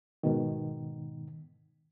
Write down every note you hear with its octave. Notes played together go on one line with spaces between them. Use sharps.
G#2 B2 D#3